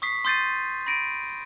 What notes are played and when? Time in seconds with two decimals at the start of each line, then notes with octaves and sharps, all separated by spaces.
0.02 C#6 D#6 B6 C7
0.25 C6 D#6 G6 A6 C7 D#7
0.87 B5 A#6 D7 D#7